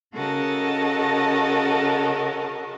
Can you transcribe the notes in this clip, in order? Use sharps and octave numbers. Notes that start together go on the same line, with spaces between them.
C#3 F#4 A4 A#4 D#5 A5